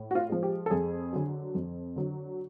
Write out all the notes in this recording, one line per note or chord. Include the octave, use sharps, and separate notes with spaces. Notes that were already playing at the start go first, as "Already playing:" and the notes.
Already playing: A2
F#4
F4
F3 G#3
G4
A4
F2 G#4
D3 F#3
F2
D3 F#3